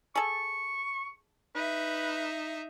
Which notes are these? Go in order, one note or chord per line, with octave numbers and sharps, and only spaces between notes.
G#4 A4 C#6
D#4 B4 E5